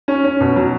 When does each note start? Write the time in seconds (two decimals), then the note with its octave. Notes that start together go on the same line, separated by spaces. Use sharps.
0.08 C#4
0.24 C#4
0.40 B2
0.56 F#3